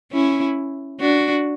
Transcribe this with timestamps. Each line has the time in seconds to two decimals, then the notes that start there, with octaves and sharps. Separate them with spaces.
0.12 C#4 E4
1.00 D4 F#4